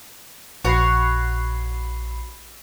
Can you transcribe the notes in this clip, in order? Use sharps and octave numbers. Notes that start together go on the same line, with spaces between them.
A#1 F#4 C#5 F#5 B5 C7